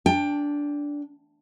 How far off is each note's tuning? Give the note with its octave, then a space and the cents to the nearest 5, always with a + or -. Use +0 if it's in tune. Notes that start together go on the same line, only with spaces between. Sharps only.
D4 -10 G5 +20